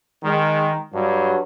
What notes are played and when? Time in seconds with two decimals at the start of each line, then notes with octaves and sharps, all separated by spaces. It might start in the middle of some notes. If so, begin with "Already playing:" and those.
0.24 D#3 G#3
0.93 G2 F#3